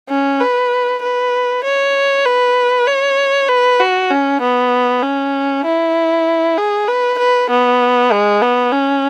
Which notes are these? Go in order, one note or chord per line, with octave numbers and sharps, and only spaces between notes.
C#4
B4
B4
C#5
B4
C#5
B4
F#4
C#4
B3
C#4
E4
G#4
B4
B4
B3
G#3
B3
C#4